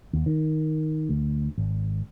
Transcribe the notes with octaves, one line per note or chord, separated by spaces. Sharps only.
D#2
D#3
D2
G#1